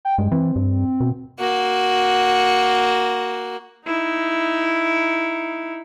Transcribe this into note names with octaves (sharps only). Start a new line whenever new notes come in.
G5
G2 G#3
E3 C4
G2
B2
A#3 F#4
D#4 E4